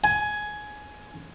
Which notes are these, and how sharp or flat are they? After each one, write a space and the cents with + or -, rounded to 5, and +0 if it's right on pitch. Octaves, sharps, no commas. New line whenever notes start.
G#5 +15